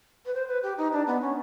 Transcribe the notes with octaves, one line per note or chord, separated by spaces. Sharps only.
B4
C5
B4
G4
D#4
D4
B3
C#4